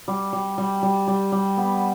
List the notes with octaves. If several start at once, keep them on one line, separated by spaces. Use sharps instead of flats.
G3
G3
G3
G3
G3
G3
B3